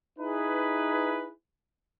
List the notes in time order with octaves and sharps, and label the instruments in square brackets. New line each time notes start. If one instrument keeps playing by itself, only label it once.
[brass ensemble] D#4 E4 G#4 B4